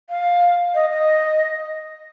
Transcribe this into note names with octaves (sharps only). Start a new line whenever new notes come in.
F5
D#5
D#5